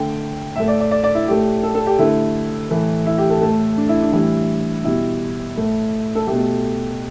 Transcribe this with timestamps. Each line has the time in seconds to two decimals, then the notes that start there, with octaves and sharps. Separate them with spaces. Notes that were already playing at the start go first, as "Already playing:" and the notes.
Already playing: D3 A3 G5
0.56 A2 A3 E5
0.68 D5
0.80 D5
0.91 D5
1.04 D5
1.15 E4
1.27 A2 A3 G4
1.63 A4
1.75 A4
1.86 G4
1.98 D3 A3 E4
2.70 A2 E3 A3
3.06 E4
3.18 G4
3.29 A4
3.41 A2 A3 A4
3.77 D4
3.89 E4
4.01 D4
4.13 A2 E3 G3 E4
4.84 B2 G3 E4
5.56 A2 A3
6.15 A4
6.27 B2 A3 G4